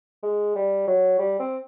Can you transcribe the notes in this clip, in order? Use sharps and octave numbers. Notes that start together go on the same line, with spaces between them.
G#3
G3
F#3
G3
C4